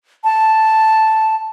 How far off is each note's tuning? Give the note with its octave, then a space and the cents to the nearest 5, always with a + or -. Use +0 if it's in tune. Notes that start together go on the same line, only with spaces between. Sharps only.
A5 +0